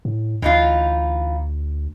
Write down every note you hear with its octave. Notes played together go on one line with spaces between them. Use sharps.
A2
D2 E3 D#4 F4